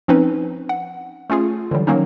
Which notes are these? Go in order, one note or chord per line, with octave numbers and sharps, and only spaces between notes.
F3 C4 C#4 D#4 B4
F#5
A3 C#4 F4 G#4
D3 E3 F#3 G3
D#3 F#3 A#3 C#4 D#4